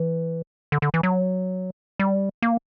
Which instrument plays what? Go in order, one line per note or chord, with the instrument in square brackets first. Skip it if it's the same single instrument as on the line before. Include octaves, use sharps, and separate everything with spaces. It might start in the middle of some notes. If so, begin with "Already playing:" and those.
Already playing: [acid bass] E3
D3
D3
E3
F#3
G3
A#3